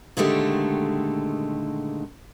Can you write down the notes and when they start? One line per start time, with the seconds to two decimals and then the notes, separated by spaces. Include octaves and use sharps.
0.17 A#2 D3 D#3 G#3 A3 G4